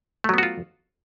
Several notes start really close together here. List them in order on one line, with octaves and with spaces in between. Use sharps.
A3 F#3 B3 F#4 F4